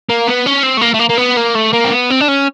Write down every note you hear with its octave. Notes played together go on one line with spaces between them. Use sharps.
A#3
B3
C#4
C4
A3
A#3
A3
A#3
A#3
B3
A#3
A3
A#3
C4
B3
C4
D4
C#4